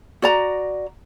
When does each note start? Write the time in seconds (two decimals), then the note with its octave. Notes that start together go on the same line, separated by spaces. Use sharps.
0.22 F#4 D5 A#5